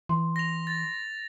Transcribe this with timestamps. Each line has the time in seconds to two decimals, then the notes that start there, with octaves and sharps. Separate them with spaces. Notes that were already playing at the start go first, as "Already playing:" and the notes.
0.09 E3 C6
0.36 A#6 F7
0.67 A6